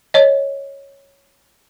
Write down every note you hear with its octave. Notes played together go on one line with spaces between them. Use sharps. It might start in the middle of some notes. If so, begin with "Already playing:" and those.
C#5 D#5